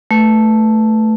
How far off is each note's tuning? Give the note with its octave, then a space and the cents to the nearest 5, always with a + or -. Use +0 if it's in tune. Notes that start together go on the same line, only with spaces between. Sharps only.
A3 +0 B4 +0